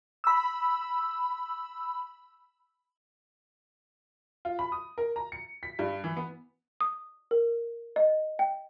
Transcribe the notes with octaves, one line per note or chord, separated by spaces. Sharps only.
B5 E6
F4
B5
D#6
A#4
A#5
C#7
B6
G2
E3
B3
D#6
A#4
D#5
G5